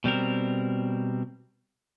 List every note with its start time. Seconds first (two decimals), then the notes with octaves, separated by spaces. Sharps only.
0.04 B2 G3 C4 A#4